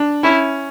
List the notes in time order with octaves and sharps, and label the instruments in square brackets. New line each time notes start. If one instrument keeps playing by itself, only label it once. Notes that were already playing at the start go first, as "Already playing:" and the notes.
Already playing: [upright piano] D4
[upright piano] C#4 [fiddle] E4